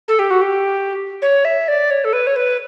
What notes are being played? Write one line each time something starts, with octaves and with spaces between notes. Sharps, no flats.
A4
G4
F#4
G4
C#5
E5
D5
C#5
A4
B4
C#5
B4